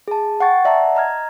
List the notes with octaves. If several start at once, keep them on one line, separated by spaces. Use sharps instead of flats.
G#4 A5
F#5 G5 C#6 A6
D5 E5 F#5 A5 A#5
D#5 A#5 F6 G#6